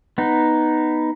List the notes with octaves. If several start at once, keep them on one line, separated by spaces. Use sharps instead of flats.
B3 D#4